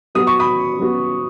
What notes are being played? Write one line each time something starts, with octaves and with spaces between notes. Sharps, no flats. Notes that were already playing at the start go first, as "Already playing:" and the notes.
F#3 B3 F#4 D#6
C#6
B5 D#6
F#3 B3 F#4